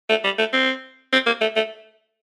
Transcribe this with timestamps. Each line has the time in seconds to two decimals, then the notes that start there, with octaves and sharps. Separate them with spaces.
0.10 A3
0.24 G3
0.39 A3
0.53 C4
1.13 C4
1.26 A#3
1.41 A3
1.56 A3